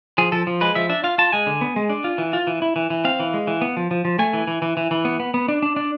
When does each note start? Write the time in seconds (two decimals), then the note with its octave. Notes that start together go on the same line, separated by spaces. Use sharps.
0.18 F3 G#4
0.32 F3 A4
0.47 F3
0.61 G#3 B4
0.75 F3 E5
0.89 D4 E5
1.04 F4 F5
1.18 F4 A5
1.33 G#3 G#5
1.47 D3
1.61 B3
1.76 G#3
1.90 D4
2.04 F4
2.18 E3
2.33 F4
2.47 E3
2.62 E4
2.76 E3
2.90 E3
3.05 C4 F5
3.20 E3
3.34 G#3
3.47 E3
3.62 B3
3.77 F3
3.91 F3
4.05 F3
4.19 A3 G#5
4.33 E3
4.47 E3
4.62 E3
4.77 E3
4.91 E3
5.05 B3
5.20 B3
5.34 B3
5.48 D4
5.63 D4
5.76 D4